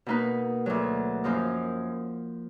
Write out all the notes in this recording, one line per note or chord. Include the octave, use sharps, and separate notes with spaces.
B2 A#3 D#4 B4
D2 D3 F#3
F#2 F3 A#3 D#4